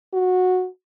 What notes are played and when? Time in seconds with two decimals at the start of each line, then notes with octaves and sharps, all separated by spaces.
0.13 F#4